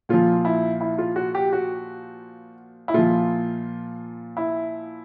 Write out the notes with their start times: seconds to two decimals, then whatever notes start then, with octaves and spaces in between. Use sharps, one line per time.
0.09 A#2 F3 F4
0.45 E4
0.81 E4
0.98 F4
1.16 F#4
1.35 G4
1.53 F#4
2.88 E4
2.94 A#2 F3 F4
4.37 E4